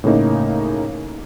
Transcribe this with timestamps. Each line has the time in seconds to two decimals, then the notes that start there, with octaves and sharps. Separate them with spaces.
0.04 A2 C#3 A#3 D#4